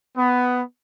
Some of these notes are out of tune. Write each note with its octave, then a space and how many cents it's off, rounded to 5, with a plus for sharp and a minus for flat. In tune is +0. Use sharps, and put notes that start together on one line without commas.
B3 +10